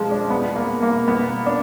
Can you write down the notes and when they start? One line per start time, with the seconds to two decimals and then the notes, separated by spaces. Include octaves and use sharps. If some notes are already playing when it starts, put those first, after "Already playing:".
Already playing: F3 G#3
0.11 D4
0.30 B3
0.55 A#3
0.82 A#3
1.08 B3
1.46 D4